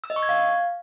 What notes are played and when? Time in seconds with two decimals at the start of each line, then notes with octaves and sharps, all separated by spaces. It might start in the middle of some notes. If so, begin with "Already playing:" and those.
0.04 E6
0.10 D#5
0.16 C#6
0.23 G#6
0.29 F5